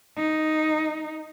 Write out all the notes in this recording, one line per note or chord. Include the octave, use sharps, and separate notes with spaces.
D#4